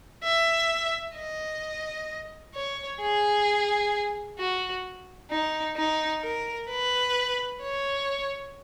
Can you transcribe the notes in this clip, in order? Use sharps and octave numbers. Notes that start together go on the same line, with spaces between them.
E5
D#5
C#5
G#4
F#4
D#4
D#4
A#4
B4
C#5